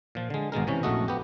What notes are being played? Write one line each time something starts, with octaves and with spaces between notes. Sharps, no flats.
A#2 F3
D3 G#3
G#1 B2 G#3 A#4
C3 E3 C#4
A#1 F#2 A3 F#4 D#5
B3 G4